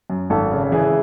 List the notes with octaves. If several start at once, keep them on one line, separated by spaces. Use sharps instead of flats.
F#2
G#1 A4
C#3
E3 G#4